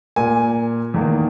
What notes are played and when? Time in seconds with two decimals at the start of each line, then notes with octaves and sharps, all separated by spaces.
0.16 A#2 A#3 G#5
0.94 E2 D#3 A#3